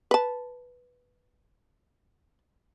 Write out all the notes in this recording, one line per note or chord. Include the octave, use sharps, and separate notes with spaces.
B4 A5